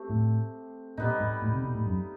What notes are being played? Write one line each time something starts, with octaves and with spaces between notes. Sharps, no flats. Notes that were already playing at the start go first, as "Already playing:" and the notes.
Already playing: A3 C4 G4
A2
A#2 G3 B3 D#4
G#2
A2
C3
B2
A2
F#2